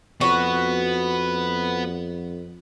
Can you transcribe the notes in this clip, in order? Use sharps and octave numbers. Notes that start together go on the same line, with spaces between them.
F2 B3 F#4 B4